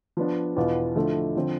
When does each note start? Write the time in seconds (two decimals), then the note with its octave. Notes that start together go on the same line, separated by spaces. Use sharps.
0.17 F3 B3 D4
0.56 E2 B2 B3 F4
0.96 D3 F3 A3 E4 A4
1.36 D3 F3 C4